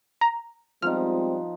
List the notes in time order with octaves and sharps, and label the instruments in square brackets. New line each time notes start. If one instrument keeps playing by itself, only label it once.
[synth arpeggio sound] A#5
[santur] F3 B3 D#4 [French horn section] G3 G#3 C4 [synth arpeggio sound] F6